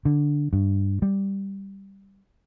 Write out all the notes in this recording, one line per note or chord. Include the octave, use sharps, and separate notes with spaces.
D3
G2
G3